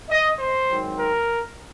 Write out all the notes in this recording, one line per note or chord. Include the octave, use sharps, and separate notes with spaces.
D#5
C5
G#2 D#3 F#3 C4
A#4